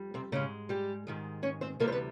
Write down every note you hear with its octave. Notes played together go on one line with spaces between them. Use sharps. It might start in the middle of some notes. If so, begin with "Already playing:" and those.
Already playing: F2 G3
C3 C4
G#2 C#3 E3 G#3 C#4
G3 G4
G#2 D#3 G#3
C#4 C#5
C4 C5
D2 C3 E3 G3 A#3 A#4
C5
B3 B4